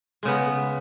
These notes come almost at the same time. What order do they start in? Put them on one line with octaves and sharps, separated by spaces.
G#3 C#3 B3